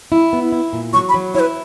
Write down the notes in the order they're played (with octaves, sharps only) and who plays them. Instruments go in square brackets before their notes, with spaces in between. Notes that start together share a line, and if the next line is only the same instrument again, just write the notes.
[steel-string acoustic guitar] E4
B3
E4
A#2
[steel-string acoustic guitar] F#3 [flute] C#6
[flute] B5
[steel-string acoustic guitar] F#3
[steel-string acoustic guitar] E4 [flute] C#5
[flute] B4